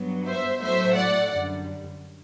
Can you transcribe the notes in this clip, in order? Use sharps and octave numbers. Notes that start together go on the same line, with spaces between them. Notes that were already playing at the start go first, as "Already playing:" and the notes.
Already playing: G2 F#3 B3
C5 E5
A2 F#3 A3 C5 E5
D5 F#5
F#2 D3 G3